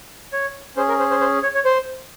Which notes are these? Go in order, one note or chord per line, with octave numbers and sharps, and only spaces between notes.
C#5
C#4 G#4 C5
A#4
C5
C5
C5
C#5
C#5
C5